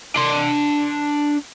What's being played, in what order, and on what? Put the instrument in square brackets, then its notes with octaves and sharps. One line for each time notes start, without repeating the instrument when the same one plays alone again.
[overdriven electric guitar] D4 C6